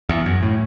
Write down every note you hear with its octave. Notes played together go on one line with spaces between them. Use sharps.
E2
F#2
A2